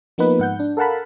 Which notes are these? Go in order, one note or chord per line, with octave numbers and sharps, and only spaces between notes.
F3 A#3 B3 D#4 B4
G#2 F#5 G6
D4
A4 A#4 F5 F#5 A5 B5